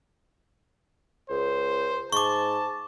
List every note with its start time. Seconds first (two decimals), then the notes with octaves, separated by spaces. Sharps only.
1.30 C#2 C5
2.13 G#2 A5 C#6 D6